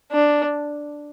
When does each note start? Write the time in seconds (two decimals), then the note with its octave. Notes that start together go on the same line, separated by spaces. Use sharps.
0.12 D4